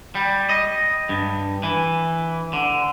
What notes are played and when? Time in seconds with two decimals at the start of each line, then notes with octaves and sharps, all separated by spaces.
0.15 G3
0.49 D#5
1.09 G2
1.63 E3
2.53 D3